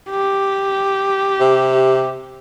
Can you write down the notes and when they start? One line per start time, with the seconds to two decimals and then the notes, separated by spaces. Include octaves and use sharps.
0.10 G4
1.41 C3